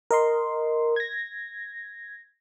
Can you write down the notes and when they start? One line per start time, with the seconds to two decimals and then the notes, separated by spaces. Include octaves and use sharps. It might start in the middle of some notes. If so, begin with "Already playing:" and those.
0.11 A#4 D#5 C6
0.96 G#6 A#6